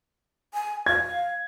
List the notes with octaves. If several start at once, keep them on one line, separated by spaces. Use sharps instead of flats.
G#5
F5 G#6